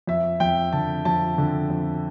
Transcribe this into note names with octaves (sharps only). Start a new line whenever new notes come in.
F2 E5
F2 G5
D3 A5
F2 A5
D3
F2